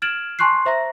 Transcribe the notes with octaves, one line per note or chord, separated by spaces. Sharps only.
F6 G#6 A6 D7 E7 F#7
G#5 A5 C6 C#6 F#6 C7
C5 E5 A#5 A#6